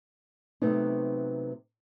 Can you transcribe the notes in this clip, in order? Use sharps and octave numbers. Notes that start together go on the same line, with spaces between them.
C3 F#3 A3 B3 C4 D#4